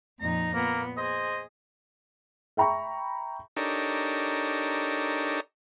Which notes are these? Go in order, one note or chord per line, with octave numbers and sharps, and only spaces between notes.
F2 A#2 D#4 A#5
A#2 A#3 B3
G#4 C5 D#5
E5 G5 A#5 B5 C#6
D4 D#4 G4 A4 A#4 C#5